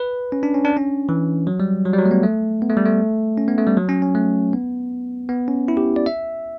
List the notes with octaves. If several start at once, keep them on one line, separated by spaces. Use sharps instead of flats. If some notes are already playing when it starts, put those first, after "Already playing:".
Already playing: B4
C#4
D4
C#4
D4
C#4
E3
F#3
G3
F#3
G3
F#3
A3
B3
A3
B3
A3
G3
A3
C#4
B3
A3
G3
F#3
C#4
C#4
A3
B3
B3
C#4
E4
G4
D5
E5